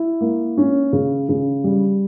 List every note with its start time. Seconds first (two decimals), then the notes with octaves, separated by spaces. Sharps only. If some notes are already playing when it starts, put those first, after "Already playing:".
Already playing: E4
0.21 A#3
0.57 C#4
0.93 C#3
1.29 C#3
1.64 G3